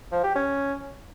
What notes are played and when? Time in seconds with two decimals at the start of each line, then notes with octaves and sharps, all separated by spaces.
0.12 F3
0.23 G4
0.35 C#4